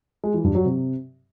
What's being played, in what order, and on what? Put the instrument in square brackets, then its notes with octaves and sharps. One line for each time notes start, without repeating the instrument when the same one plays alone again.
[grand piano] G#3
E3
G2
F#3
C3